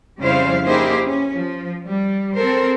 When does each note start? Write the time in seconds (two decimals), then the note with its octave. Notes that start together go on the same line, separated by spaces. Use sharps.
0.21 F2 C#3 G3 E4 C5 F5
0.65 A#3 D#4 E4 G4 G#4 C5
1.04 C#4
1.38 F3
1.84 G3
2.36 C4 A4 A#4 C5